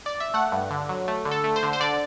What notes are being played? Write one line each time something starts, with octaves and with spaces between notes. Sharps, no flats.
D5
E5
A3 F#5
G2
D3
F#3
A3
D3
A4
A3
C5
D3
C5
D3 D5